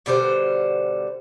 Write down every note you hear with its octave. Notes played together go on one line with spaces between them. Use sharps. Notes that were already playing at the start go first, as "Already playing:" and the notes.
B2 D3 G3 C5